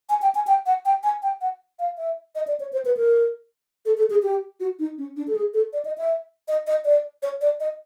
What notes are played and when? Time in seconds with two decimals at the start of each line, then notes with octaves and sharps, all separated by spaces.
0.09 G#5
0.22 G5
0.35 G#5
0.47 G5
0.66 F#5
0.85 G5
1.03 G#5
1.22 G5
1.41 F#5
1.79 F5
1.98 E5
2.35 D#5
2.47 D5
2.60 C#5
2.73 C5
2.85 B4
2.97 A#4
3.86 A4
3.97 A4
4.10 G#4
4.22 G4
4.60 F#4
4.79 D#4
4.98 C#4
5.17 D4
5.27 A4
5.35 G#4
5.54 A4
5.73 D5
5.85 D#5
5.98 E5
6.48 D#5
6.67 D#5
6.85 D5
7.23 C#5
7.41 D5
7.60 D#5